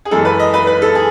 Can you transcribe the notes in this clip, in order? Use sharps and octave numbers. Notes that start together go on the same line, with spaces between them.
G#4
F#2 E3 G#3 A4
B4
D#5
B4
B4
A4
G#4